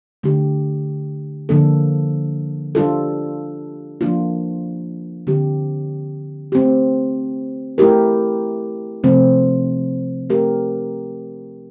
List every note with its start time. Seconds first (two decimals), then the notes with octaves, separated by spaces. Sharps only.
0.23 D3 A3 D4 G4
1.49 D3 F3 A#3 D4 A4
2.75 G3 D4 F4 A4
4.01 F3 A#3 D4 F4
5.27 D3 G3 C4 G4
6.52 A3 C4 G4
7.78 A3 E4 G4 A#4
9.04 C3 F3 A3 C4
10.30 A3 C4 G4 A#4